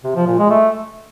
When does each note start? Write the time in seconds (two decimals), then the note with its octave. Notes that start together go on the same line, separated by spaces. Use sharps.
0.04 C3
0.16 F3
0.27 A#2
0.39 G#3
0.50 A3